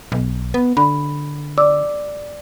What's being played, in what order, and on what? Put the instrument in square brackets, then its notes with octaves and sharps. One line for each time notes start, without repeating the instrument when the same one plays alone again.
[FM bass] B1
B3
[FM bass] D3 [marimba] B5
[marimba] D5 D6 E6